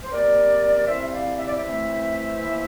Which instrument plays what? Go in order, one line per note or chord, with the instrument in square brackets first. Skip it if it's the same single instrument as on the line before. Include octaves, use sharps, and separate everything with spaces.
[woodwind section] C5
C3 G3 A#3 A#4 D5
E3 G3 C4 C5 E5
E5
D5 F5
E5
D5
C5 E5
E3 A3 C4
E3 A#3